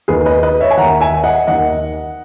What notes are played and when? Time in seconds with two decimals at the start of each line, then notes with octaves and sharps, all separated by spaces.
0.08 D#2 D#3 G#4 B4
0.26 B4 D#5
0.43 B4 D#5
0.61 C#5 E5
0.71 G#5
0.77 D#2 D#3 F#5 A#5
1.01 E5 G#5
1.24 D#5 F#5
1.47 D#2 D#3 D#5 F#5